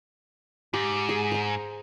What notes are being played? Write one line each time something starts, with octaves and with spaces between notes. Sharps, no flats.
G#2 G4
G#4
C5 A#5